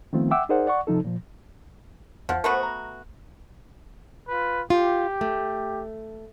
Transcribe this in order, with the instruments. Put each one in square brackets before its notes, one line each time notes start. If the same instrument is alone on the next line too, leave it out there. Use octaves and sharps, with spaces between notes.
[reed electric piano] D#3 F3 A3 B3 C4 F4
E5 F#5 G5 D6 E6
D#4 G#4 A#4 C5 D5 F#5
D5 F#5 C#6
C3 F3 D#4 A4
A#2 F3
[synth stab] E2 F#5 [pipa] F3
[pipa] A3 B3 F#4 [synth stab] A#4 C5 F#5
[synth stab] A#5
[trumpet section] F4 B4
[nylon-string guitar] F4 [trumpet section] G4
[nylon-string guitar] A3